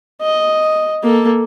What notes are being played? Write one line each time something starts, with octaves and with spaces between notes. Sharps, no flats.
D#5
A#3 A4